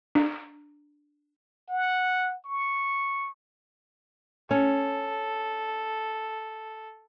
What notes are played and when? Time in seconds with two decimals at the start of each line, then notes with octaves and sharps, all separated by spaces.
0.15 D4
1.69 F#5
2.45 C#6
4.51 C#4 A4